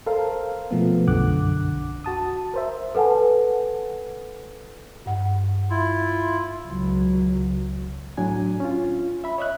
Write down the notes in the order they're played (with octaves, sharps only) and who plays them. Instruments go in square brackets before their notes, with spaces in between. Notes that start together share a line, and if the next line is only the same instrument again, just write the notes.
[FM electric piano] A4 A#4 C5 F5
B2 F3 A3 B3
B1 F#2 D3 F#5 D6 F#6
F#4 A5 D#6
A#4 C5 E5
[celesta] A4 B4 F#5 G#5 A5
[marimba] G2 F#5
[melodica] E4 F4
[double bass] C#2 F#3
[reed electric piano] A2 F#3 D4 G#5
C#4 F4
E5 B5
C#5 D#5 E5 F#6